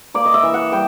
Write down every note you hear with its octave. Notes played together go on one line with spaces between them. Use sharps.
A#3 D5
D#5
E5
E3
F#5
G3 G5